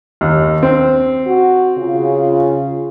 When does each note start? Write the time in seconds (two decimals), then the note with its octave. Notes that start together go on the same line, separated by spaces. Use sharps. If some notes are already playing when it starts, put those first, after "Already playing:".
0.21 D#2
0.63 C4
1.26 F#4
1.77 C#3 F4